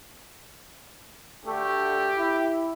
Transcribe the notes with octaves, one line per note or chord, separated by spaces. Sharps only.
D2 D3 A3 G4
E4